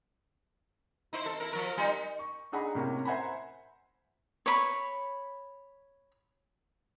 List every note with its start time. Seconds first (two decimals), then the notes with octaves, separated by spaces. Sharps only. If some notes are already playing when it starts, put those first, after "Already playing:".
1.13 D#4 E4 C5
1.26 A4
1.40 E4 A#4
1.53 F3 A#4
1.77 G3 D#4
2.19 C#6
2.52 D4 D#4 G#4 F#5 A#5 B5
2.75 A2 C3 A#3 C#4
3.05 C5 E5 F#5 G#5 A#5 B5
4.46 C#5 B5